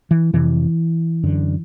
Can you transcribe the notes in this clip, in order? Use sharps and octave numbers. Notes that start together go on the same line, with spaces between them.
E3
F2 C3 E3
F#2 D3